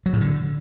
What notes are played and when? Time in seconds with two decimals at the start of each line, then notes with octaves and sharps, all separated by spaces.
0.06 F#3
0.13 A2
0.21 D3